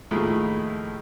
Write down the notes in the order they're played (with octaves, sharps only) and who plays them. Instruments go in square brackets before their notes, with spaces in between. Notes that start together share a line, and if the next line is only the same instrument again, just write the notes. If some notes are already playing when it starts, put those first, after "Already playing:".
[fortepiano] D#2 A2 F3 A3 E4 G#4